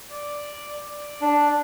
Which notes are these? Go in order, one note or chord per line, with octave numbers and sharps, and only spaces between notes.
D5
D5
D4